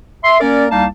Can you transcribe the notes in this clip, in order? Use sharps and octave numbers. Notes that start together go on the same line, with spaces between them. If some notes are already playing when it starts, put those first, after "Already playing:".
E5 C6
A#3 C#4 A#4 D5
C2 G3 A#3 D#4 F5 A5